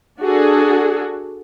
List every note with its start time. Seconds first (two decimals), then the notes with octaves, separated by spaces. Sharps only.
0.20 D4 F#4 G#4 A4